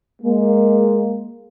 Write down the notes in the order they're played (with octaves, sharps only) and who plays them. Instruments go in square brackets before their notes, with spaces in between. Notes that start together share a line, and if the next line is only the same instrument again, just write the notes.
[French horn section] G#3 A#3